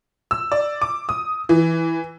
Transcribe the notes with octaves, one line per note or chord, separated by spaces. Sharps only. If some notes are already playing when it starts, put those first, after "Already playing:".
E6
D5
D6
D#6
E3